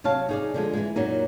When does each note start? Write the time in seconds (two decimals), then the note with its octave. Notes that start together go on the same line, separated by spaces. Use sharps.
0.04 C3 F#3 C#5 F5 A5
0.29 D#4 G#4 D5
0.54 D3 F3 G#3
0.73 E3 G#3
0.96 F#2 A#2 F#3 D#4